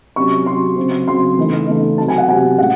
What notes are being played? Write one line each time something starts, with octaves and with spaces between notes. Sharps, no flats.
C3 F#3 C#4 C#6
C3 F#3 C#4 C6
C#3 F#3 C4
C#3 F#3 C4 C6
C#3 E3 A3 D#4
C#3 E3 A3 D#4
C3 F#3 C4 A5
G#5
F#5
C3 F#3 C4 G#5
A2 G#3 C#4 F#5